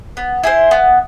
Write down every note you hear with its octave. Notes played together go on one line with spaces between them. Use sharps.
B3
E4 G#4 C5
B3